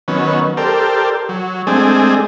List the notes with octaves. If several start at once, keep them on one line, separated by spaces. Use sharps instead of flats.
D#3 F#3 B3 C#4
G4 A4 A#4 C5 D5
F#3
G#3 A3 C4 D4 G#4